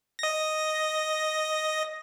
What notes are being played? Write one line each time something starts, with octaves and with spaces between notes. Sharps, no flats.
D#5 A#6